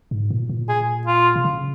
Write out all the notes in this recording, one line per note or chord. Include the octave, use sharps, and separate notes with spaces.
G#2
A#2
A#2
G#4
F4
C3
C#3